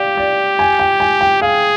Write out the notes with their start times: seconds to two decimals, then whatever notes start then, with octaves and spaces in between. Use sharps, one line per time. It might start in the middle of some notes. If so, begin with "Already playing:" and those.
Already playing: G4 D5 F5 G5
0.17 D5
0.59 G#5
0.79 G5
1.00 G#5
1.21 G5
1.42 G#4 F5